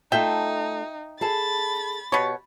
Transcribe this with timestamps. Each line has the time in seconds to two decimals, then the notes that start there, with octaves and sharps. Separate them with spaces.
0.12 A3 D#4 F4 A4 E5 G5
1.21 G#4 A4 A5 B5 A6
2.12 B2 G4 C#5